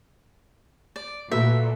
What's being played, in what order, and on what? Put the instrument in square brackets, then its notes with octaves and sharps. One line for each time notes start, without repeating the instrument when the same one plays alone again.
[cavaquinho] D5
[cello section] A#2 [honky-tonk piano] A3 F#4 B4 [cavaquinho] E5